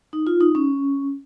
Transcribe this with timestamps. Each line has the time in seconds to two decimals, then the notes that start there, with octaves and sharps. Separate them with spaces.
0.13 D#4
0.27 F4
0.40 D#4
0.55 C#4